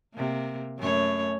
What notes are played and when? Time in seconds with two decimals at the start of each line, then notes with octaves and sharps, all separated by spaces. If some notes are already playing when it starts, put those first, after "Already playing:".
0.14 C3 A#3
0.79 F#2 A3 C#5